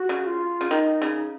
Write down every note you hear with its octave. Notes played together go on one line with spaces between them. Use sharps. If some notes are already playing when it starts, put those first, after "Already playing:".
Already playing: F#4
C#3
F4
C#3
D#3 D#4
C#3